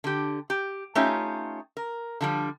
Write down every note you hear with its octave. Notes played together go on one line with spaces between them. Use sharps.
D3 G4
G4
A3 C#4 D#4 F4 G4 C#5
A#4
D3 F3 G3